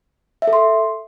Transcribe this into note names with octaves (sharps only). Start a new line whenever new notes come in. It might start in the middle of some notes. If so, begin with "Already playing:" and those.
E5
A4
C6